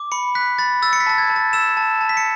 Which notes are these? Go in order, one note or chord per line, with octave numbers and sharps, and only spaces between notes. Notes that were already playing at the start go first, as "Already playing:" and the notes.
Already playing: D6
B5 C#7
F#6 B6
B5 A6
E6 A6
C#7
B6
A5 A6
G#6
A5
A6
E6 E7
A5
A5
B6
C#7